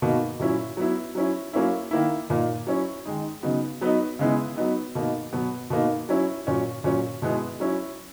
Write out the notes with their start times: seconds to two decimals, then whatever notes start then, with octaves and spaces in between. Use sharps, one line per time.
0.02 B2 A#3 D#4
0.40 A#2 F#3 C#4 E4
0.77 F#3 B3 E4
1.15 F#3 C#4 E4
1.53 F#3 A#3 C#4 E4
1.91 D#3 A#3 E4
2.30 A#2 A#3 D#4
2.67 F#3 C#4 E4
3.06 D#3 G#3 D#4
3.43 C#3 F#3 B3 D#4
3.81 F#3 B3 D#4
4.19 C#3 G#3 B3 E4
4.56 F#3 B3 D#4
4.95 B2 A#3 D#4
5.33 B2 F#3 B3
5.70 B2 A#3 D#4
6.09 F#3 C#4 E4
6.47 A#2 F#3 C#4
6.84 A#2 F#3 C#4
7.22 B2 G#3 B3 E4
7.60 F#3 C#4 E4